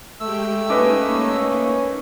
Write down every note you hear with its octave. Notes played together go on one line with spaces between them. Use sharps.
G#3 A3 G4 G5 E6
A#3 C#4 D#4 B4 D#5 D6